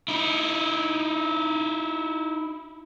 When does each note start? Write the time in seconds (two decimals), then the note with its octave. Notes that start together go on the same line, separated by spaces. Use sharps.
0.08 D#4 E4